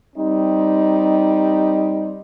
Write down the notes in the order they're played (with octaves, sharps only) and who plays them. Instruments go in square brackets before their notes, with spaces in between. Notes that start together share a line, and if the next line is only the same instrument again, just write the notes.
[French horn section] G3 C4 D#4